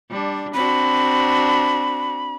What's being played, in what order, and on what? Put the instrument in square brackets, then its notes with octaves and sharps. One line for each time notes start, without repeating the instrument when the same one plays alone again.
[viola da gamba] G3 D4
[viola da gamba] C4 D4 F#4 [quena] B5